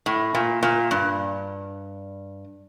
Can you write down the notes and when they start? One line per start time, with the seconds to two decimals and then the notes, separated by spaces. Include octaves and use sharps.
0.06 A2
0.35 A#2
0.63 A#2
0.91 G2